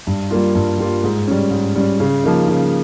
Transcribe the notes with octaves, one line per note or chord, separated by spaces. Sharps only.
G2
G3 A#3 F4
G2
G3 A#3 F4
G#2
G3 C#4
G#2
G3 C#4
C#3
F3 A#3 D#4
C#3